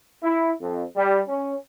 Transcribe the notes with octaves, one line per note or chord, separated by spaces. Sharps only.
E4
F2
G3
C#4